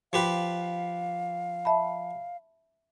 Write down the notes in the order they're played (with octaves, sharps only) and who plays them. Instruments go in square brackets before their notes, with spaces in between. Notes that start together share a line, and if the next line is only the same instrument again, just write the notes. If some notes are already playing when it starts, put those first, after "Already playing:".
[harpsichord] F3 G4 B4 [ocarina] F5
[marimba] E5 A5 B5